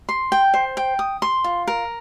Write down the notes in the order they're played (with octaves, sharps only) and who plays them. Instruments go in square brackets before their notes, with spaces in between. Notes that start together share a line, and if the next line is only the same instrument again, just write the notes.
[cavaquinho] C6
G5
C5
G5
D#6
C6
F4
A#4